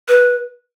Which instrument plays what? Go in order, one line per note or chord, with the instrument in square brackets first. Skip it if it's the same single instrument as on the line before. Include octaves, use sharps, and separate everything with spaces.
[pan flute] B4